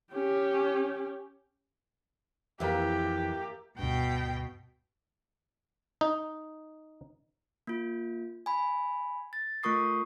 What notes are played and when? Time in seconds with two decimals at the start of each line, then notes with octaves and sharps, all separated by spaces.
0.13 C#4 G4
2.60 F2 E3 A#3 G4 D5 E5
3.79 D2 G2 B2 G5
6.01 D#4
7.67 A#3 F4
8.46 G#5 B5
9.33 A6
9.63 A3 F4 A#4 C#6 D#6 C7